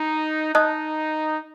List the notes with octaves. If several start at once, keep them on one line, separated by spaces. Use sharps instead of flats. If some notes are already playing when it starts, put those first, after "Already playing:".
Already playing: D#4
D#4 D#5 A5 D#6 F#6